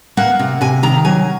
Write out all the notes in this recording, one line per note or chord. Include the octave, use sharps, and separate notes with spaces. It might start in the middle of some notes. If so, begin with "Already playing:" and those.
A#3 F#5
C3
C3 G#5
D#3 A#5
F#3 G#5